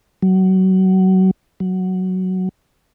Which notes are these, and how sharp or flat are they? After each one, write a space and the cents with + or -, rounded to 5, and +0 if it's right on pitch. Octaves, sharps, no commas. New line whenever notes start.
F#3 +25
F#3 +5